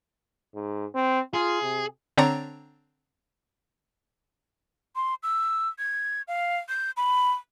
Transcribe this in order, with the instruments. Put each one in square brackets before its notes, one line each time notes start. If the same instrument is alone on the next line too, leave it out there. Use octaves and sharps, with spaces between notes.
[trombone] G#2
C4
[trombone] F4 [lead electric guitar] G#4
[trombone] C3
[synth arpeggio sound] D3 C4 D4 C#5 A#5 A6
[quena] C6
E6
G#6
F5
G6
B5